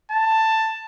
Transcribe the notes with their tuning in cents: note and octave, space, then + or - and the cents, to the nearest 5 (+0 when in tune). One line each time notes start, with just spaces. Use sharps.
A5 +10